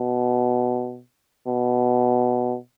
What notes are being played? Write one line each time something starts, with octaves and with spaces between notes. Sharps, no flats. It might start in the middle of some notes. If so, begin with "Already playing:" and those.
Already playing: B2
B2